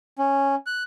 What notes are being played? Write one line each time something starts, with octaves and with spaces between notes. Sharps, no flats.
C#4
F#6